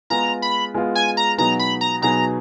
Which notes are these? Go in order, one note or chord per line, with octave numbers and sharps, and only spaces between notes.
G#3 B3 F4 G#4 A#5
B5
G#3 B3 F4 G#4
G#5
A#5
B2 F#3 B3 D#4 G#4 A#5
B5
A#5
B2 F#3 B3 D#4 G#4 A#5